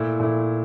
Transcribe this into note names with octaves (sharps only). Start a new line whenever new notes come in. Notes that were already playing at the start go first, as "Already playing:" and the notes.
Already playing: A#2 A3 E4
A#2 A3 E4